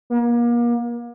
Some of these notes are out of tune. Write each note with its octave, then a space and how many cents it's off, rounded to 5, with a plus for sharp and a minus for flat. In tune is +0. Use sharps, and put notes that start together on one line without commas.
A#3 +35